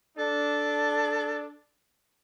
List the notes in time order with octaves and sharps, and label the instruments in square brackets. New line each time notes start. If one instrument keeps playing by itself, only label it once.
[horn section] D4 [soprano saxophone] A4